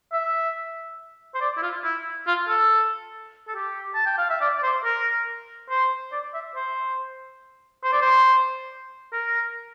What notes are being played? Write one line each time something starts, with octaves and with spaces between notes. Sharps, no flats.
E5
C5
D5
E4
F4
E4
F4
A4
A4
G4
A5
G5
F5
E5
D5
D5
C5
A#4
C5
D5
E5
C5
C5
D5
C5
A#4